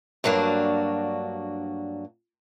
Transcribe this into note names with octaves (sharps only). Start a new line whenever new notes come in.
G2 F#3 A#3 D4 F#4